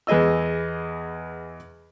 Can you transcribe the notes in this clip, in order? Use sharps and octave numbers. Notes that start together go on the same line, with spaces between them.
E2 B3 G#4 D#5 E6